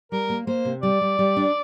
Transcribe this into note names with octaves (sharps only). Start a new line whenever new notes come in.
G3 A#4
A#3
A#3 C5
C3
G3 D5
G3
G3
D4